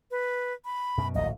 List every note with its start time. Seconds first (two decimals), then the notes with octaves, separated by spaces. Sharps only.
0.11 B4
0.65 B5
0.98 F#2 B2
1.15 D1 A#1 D#5